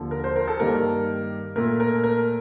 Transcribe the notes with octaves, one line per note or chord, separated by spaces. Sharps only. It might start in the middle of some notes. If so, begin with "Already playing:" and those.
Already playing: D#2 D3 F3
A#4
C5
A#4
A4
G2 D#3 G3 A#3 A#4
A#2 A3 A#4
A#4
A#4